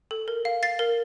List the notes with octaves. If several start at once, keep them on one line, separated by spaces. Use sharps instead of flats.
A4
A#4
F5
F5 A6 C7
A#4